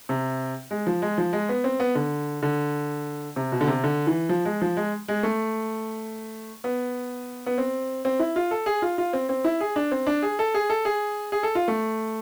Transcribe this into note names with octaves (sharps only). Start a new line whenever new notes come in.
C3
G#3
F3
G#3
F3
G#3
B3
C4
B3
D3
D3
C3
B2
D3
C3
D3
E3
F3
G#3
F3
G#3
G#3
A3
B3
B3
C4
C4
E4
F4
A4
G#4
F4
F4
C4
C4
E4
G#4
D4
C4
D4
G#4
A4
G#4
A4
G#4
G#4
A4
F4
A3